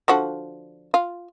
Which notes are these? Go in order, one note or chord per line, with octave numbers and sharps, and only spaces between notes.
D3 F3 F#4
F4